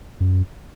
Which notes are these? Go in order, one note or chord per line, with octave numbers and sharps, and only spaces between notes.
F#2